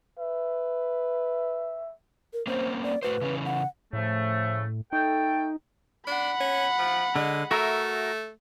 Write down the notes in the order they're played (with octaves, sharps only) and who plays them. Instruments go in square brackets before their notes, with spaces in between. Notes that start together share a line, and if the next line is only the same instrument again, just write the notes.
[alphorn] B4 [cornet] E5
[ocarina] A#4
[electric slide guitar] A#3 C4 C#4 [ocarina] C5
[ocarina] D5
[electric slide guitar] A2 F#4 C5 [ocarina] B4
[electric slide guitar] C#3 E3 C#4
[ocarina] F#5
[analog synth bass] A2 [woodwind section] C#3 F3 A3
[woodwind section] A3 A4 G5 [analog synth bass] D#4
[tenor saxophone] D4 [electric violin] F#5 B5
[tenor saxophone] C#4
F3
[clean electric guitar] D3 [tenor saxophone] G#3
[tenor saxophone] A3 [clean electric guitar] F#4 A#4 E5